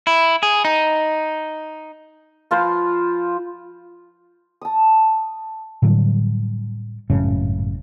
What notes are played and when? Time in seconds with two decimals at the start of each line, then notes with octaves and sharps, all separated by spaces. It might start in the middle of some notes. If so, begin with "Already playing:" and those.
0.07 E4
0.43 G#4
0.65 D#4
2.51 F3 F4 B4 C5
4.62 A5 D#6
5.82 A2 D3 F#3 G3
7.10 G#1 F#2 A2 C#3